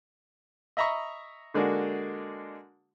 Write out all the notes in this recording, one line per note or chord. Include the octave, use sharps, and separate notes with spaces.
D#5 E5 A#5 B5 C#6
D3 G#3 A#3 D4 F#4